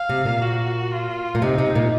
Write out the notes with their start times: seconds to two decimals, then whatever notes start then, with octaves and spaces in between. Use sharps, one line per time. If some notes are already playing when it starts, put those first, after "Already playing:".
Already playing: F5
0.10 C3
0.25 A#2
0.42 F#4
0.92 F4
1.35 A#2
1.42 C3 D#4
1.58 C3
1.75 A#2